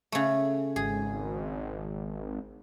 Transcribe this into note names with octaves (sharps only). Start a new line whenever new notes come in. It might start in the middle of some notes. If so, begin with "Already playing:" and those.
C#3 A3
G#1 G#4